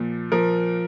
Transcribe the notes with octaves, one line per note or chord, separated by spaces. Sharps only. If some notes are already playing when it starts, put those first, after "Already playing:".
Already playing: A#2 F3
F3 A#4